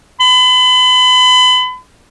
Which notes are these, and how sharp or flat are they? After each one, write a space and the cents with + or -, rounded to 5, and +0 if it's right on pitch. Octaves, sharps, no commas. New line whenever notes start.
B5 +35